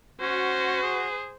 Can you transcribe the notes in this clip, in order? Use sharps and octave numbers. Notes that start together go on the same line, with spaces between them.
C#4 F#4 C5
G#4